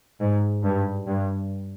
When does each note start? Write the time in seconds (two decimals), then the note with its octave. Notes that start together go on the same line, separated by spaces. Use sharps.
0.20 G#2
0.63 G2
1.07 G2